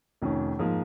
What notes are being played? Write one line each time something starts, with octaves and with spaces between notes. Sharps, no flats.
F1 F2 D#3 C#4
G#2 F3 A#3